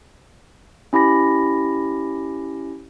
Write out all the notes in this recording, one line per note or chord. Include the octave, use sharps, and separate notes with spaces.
C#4 E4 G4 B5 A#6